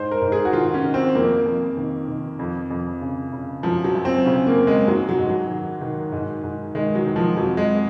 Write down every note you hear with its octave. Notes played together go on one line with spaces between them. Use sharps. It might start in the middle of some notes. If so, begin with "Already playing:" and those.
Already playing: G#2 C5
A#4
G#2
G#4
F#4
D#3 F4
C#4
D#3
C4
F2 A#3
F2
D#3
D#3
F2
F2
C#3
C#3
F#2 F3
F#3
F#2
C4
C#3 C#4
A#3
C#3
G#3
G#2 F#3
F#3
G#2
F#3
D#3
D#3
G#2
G#2
D#3 G#3
F#3
D#3
F3
F2 F#3
G#3